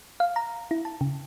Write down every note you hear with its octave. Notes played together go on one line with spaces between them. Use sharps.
F5
A#5
E4
A5
C#3